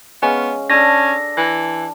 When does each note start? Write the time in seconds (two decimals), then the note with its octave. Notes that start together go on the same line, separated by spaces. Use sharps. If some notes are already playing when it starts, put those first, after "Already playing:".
0.22 G#3 B3 C#4 F5
0.70 C#4 D4 A4 A#6
1.37 E3